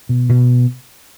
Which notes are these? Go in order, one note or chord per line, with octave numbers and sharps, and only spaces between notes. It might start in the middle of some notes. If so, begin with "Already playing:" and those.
B2
B2